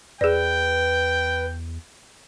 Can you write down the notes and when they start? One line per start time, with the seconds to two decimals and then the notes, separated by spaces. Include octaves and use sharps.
0.21 E2 G#4 B4 D5 G5